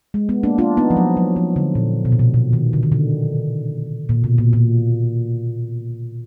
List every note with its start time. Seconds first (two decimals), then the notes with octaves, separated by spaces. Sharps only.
0.14 G#3
0.29 G#3 B3
0.43 A#3 D4
0.58 D4 F4
0.77 B3 D#4
0.90 F3
0.97 F#3
1.17 F#3
1.36 F3
1.56 D3
1.75 A#2
2.05 B2
2.12 A#2
2.19 B2
2.34 B2
2.53 D#3
2.73 D3
2.83 D#3
2.92 D3
4.09 A#2
4.24 B2
4.38 A#2
4.53 A#2